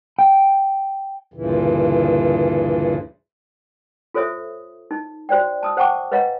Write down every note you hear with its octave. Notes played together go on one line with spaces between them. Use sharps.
G5
D2 G2 A#2 C#3 E3
F4 A4 C5 C#5 E5 D#6
D#4
F#4 C5 D5 G5
A5 D#6 E6
C5 F#5 G5 A5 C#6 D6
B4 C#5 D#5 F5 F#5 A#5